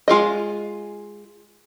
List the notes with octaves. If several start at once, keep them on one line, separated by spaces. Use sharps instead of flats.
G#3 F4 G#4 D#5